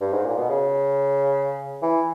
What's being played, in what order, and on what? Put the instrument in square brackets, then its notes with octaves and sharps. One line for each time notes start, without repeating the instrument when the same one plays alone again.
[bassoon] G2
G#2
A#2
B2
C#3
E3